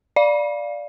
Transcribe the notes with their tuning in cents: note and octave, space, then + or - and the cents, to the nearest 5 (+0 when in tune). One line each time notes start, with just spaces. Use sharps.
D5 +0 F5 +0